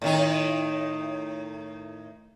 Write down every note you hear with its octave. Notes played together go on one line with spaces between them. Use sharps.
A2 D#3 D#4